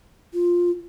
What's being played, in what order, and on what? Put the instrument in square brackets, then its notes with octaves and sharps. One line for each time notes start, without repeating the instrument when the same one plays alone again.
[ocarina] F4